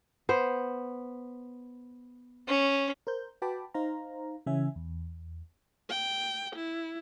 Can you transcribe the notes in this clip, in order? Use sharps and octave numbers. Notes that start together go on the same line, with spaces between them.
B3 C5
C#4
A#4 C5 G6
F#4 B4 G5 A5 B5 D6
D#4 C5 F5 A#5
C#3 E3 C#4 E5 G#5
E2
G5
E4